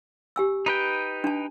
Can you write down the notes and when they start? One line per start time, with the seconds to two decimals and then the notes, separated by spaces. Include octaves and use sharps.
0.36 G4 G#5 E6
0.66 D#4 B4 G5
1.24 D4 A5